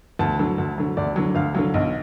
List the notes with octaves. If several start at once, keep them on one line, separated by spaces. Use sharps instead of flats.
D2 A5
D3 F#3
D2
D3 F#3
D2 D5
D3 F#3
D2 F5
D3 F#3
B1